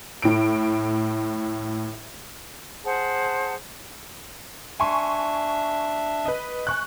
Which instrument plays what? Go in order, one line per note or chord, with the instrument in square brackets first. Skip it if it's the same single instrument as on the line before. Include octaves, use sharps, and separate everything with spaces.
[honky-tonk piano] A2 D7
[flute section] G#4 C5 F#5 A5
[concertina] D4 E5 [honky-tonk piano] G#5 C6 C#6
[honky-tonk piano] B4 D#5
G#5 C#6 F#6